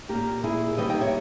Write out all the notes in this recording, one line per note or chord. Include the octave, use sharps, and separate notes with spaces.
A#2 A#3 G4 A#4
E4 G#4
D#3 G3 A#3 B4 D#5
D#5 G5
C#5 E5